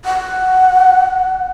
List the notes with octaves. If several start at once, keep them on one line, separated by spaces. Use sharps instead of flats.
F#5